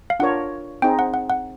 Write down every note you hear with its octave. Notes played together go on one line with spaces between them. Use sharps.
F5
D4 F4 A#4 C#5 F#5
C4 D#4 G#4 G5
F#5
F#5
F#5